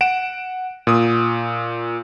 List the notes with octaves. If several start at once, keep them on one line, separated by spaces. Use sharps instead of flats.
F#5 D7 E7
A#2 D#6